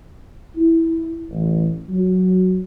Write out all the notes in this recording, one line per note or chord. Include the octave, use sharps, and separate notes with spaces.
E4
A1
F#3